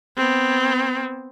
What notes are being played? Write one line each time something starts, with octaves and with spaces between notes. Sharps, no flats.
B3 C4